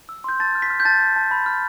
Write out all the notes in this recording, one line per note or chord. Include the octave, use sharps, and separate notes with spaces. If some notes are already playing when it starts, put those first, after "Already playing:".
E6
C6 G6
A5 A6
F6
B6
F6
G6
A5 A6
A5
A5
B5
F6